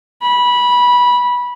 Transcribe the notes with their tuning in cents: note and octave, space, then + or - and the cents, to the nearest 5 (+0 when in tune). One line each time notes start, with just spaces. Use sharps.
B5 -15